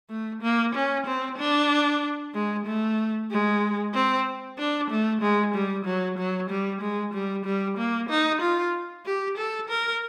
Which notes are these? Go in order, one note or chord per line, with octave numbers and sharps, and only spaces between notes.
A3
A#3
C#4
C4
D4
G#3
A3
G#3
C4
D4
A3
G#3
G3
F#3
F#3
G3
G#3
G3
G3
A#3
D#4
F4
G4
A4
A#4